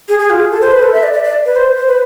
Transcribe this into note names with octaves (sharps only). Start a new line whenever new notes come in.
G#4
G#4
F4
G#4
A4
C5
B4
A4
E5
D5
D5
D5
B4
C5
C5
B4